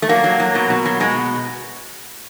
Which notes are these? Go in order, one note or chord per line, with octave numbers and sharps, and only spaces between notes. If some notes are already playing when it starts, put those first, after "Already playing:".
A3
F#3 A#3
F#3
F#3
B2
B2
F#3
B2 G#3